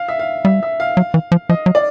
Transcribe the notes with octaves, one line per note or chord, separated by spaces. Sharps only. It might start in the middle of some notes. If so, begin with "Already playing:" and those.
Already playing: F5
E5
F5
G3 E5
E5
F5
F#3
E3
F3
F3 D#5
F#3
D5